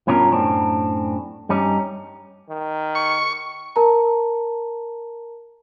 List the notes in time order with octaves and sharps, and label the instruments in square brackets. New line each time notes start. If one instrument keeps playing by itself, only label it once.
[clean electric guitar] G2 B2 C#4 F4 F#4 A#4
F#2 A2 C4 D4
G2 G3 C#4 D#4
[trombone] D#3
[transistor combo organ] C#6
[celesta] A#4 A5 A#5